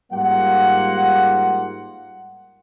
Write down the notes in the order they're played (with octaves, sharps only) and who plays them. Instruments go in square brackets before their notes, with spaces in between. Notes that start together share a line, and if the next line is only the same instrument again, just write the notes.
[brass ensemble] G#2 G3 A#3 F4 F#5